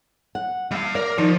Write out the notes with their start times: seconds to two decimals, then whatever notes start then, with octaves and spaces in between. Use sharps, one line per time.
0.35 F#5
0.71 G3 E5 F5
0.95 A#4 D5
1.18 D#3 F3